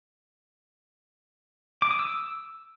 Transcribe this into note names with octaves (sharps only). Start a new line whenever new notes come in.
D6
D#6
E6